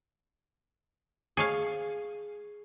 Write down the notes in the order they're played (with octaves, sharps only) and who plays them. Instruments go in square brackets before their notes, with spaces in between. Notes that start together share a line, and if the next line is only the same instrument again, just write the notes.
[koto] G#4 C#5 F5